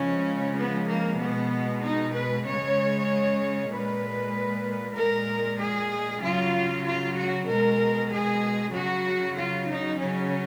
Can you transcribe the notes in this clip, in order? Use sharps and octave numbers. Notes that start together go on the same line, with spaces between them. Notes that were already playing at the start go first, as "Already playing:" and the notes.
Already playing: C#3 F3 G#3 C#4
B3
A#3
B2 G#3 B3
D#4
B4
C#3 G#3 C#5
A#2 G#3 B4
A#2 G#3 A#4
G#4
C#3 F#3 F4
F4
F#4
B2 G#3 A#4
G#4
C#3 F#3 F#4
F4
D#4
C#3 F#3 C#4